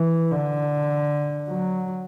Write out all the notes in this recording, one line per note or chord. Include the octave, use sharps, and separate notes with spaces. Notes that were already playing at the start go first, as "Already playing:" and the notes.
Already playing: E3
D3
F#3